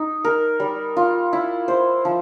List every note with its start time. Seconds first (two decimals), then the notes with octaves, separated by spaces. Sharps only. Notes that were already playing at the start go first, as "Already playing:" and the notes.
Already playing: D#4
0.25 A#4
0.60 G3
0.97 F4
1.33 E4
1.68 C5
2.05 F3